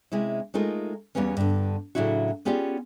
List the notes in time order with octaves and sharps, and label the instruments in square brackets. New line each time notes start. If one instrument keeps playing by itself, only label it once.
[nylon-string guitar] C3 G#3 C#4 E4
G#3 A3 D#4 F4 A#4
E2 E3 G3 A#3 B3 C#4
G2 D3
A2 C#3 F#3 D4 E4 F#4
B3 C#4 F4 G4 G#4 D5